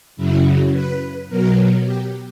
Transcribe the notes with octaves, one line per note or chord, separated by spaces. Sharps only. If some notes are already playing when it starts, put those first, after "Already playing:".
F#2 C#3 F#3 E4
B4
B2 F#3 A#4
G4